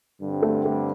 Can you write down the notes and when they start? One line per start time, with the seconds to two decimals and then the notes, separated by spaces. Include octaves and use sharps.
0.20 G2 D3 G3 C4
0.42 A3
0.65 A3